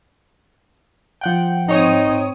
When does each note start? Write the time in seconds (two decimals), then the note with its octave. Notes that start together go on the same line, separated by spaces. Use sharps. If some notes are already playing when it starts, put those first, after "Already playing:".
1.21 F3 F#5 G5
1.68 G#2 C4 D#4 C#5 D#6